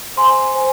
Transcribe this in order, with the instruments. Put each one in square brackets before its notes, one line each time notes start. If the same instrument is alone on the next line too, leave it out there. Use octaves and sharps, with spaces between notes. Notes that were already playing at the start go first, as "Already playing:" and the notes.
[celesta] C5 G#5 C6
C5 G#5